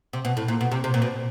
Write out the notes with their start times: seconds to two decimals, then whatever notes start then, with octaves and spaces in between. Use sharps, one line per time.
0.13 C3
0.25 B2
0.37 A2
0.48 A#2
0.61 B2
0.72 C3
0.84 C3
0.94 A#2
1.02 B2